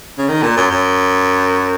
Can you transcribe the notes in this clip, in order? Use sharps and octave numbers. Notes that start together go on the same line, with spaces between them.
C#3
D#3
A#2
F#2
F#2